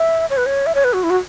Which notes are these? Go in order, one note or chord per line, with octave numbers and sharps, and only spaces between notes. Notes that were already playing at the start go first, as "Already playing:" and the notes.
Already playing: E5
C#5
B4
C#5
E5
C#5
B4
F#4
E4
F#4